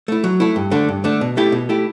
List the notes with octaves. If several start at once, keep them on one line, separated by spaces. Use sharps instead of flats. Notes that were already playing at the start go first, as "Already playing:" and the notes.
A3 E4
F#3
A3 E4
G2
D3 A3 D4
G2
D3 A3 D4
B2
A3 E4 G4
B2
A3 E4 G4